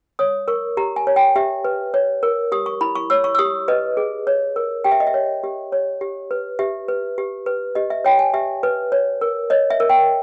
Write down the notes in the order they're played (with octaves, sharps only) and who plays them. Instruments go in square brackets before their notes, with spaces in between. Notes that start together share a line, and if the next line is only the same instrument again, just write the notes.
[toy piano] C#5 D#6
A#4 C#6
G4 A#5
G#5
C#5
G5
G4 E5
B4
C#5
A#4
G4 D#6
C#6
E4 B5
C#6
C#5 E6
C#6
E6
G4 D#6
B4 D#5
G#4
C#5
A#4
G4 G5
E5
D#5
E5
C#5
G4
C#5
G4
B4
G4 E5
B4
G4
B4
G4 D#5
E5
C#5 G5
G#5
G4 E5
B4
C#5
A#4
C#5 D#5
E5
A#4
G5